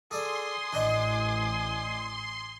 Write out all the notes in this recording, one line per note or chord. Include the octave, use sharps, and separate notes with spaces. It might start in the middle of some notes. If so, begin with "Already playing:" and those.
G#4 A4 D5 G#5 C6 D#6
A1 D4 C5 D#5